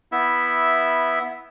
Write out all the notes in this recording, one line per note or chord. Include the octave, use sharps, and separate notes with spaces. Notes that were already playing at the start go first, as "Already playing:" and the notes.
B3 E4 E5